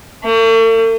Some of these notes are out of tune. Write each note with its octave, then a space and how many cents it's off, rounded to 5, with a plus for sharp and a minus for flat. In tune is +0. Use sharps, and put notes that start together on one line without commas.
A3 +45